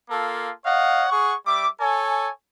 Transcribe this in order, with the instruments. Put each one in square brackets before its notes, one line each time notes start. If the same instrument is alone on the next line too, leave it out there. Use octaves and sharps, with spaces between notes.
[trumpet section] A#3 F4 A4
C#5 D#5 F5 F#5
G#4 F#5 C#6
G3 E5 D6
A4 C#5 G#5